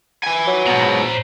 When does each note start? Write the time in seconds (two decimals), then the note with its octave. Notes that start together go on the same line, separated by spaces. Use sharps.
0.23 B4 G#5
0.47 F#3
0.67 G#2 B2 C5 A#5